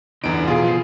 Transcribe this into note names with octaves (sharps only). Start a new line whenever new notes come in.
E2 D3 B3 D#4 D7
B2 F4 G#4
F3